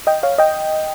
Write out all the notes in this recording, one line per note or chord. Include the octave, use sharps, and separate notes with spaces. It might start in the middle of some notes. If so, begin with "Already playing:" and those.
D#5 G5
C#5 F5
D#5 G5